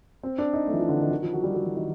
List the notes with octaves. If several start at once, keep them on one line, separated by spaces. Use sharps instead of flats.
C4
D4
D#4
A3
E3
F3
D3
D#3
D#3
F3
F#3
G3
F#3
E3
D#3